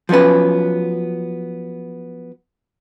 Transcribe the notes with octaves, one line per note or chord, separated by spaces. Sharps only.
F3 F#3 B3 C#4 B4